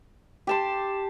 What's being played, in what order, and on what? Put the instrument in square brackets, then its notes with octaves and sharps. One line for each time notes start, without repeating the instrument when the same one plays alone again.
[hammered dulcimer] G4 A5 C6